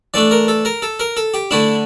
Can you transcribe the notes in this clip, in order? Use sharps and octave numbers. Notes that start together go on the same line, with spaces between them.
E3 A3 D4 D5
A#4
A4
A#4
A4
A#4
A4
G4
D3 A3 D4 E4